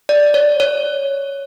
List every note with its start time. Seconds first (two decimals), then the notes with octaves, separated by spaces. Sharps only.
0.09 D5
0.34 C#5
0.60 C#5